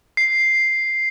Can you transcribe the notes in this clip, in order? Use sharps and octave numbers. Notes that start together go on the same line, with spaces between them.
C7